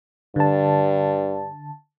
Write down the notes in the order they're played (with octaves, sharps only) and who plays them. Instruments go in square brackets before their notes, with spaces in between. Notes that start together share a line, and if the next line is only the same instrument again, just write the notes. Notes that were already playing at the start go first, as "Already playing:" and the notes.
[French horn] G2 [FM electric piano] D3 A5